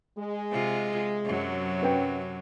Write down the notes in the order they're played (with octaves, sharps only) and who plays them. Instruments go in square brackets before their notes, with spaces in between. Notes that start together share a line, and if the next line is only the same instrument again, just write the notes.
[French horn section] G#3
[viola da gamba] C3 F4
F#2 C3 F#3
[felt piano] C#4 B4 G5